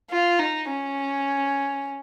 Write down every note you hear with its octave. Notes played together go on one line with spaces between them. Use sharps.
F4
D#4
C#4